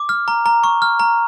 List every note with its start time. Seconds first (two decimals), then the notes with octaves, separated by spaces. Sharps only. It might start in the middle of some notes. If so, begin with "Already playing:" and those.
Already playing: D6
0.09 F6
0.28 A#5
0.46 A#5
0.64 C#6
0.82 F6
0.99 A#5